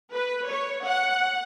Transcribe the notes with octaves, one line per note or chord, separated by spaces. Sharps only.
B4
C#5
F#5